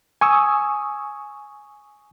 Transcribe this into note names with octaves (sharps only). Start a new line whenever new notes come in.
G#5 C#6 D#6 E6